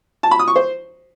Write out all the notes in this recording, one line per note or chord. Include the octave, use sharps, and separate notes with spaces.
A5
B5
D#6
C#6
C5